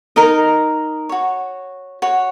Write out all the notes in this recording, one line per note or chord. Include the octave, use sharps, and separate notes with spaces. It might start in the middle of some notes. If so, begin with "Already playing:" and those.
D#4 A#4 D#5
F#4 C#5
F#4 C#5